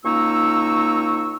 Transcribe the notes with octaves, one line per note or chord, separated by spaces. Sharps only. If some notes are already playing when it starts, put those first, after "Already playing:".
C#2 A#3 D#4 C#6 E6